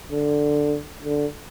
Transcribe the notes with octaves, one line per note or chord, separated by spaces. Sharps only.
D3
D3